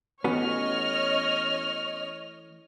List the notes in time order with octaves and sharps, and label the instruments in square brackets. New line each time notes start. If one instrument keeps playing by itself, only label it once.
[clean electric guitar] E3 A3 [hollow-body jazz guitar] B3 C#4 F#4 [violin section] C#5 D#5 F6